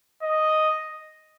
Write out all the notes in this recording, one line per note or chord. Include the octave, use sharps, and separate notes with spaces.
D#5